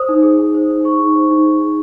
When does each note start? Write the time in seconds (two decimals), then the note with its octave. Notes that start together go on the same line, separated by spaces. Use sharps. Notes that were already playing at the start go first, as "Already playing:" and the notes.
Already playing: C5 D#6
0.09 D#4
0.23 G#4
0.39 D#4
0.54 C5
0.70 D#4
0.84 G#4 C#6
1.00 D#4
1.15 C5
1.30 D#4
1.46 G#4
1.61 D#4